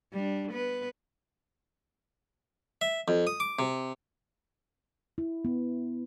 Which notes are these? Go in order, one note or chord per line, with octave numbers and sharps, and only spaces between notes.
G3 D4
B3 B4
E5
F2
D#6
D6
C3
E4
B3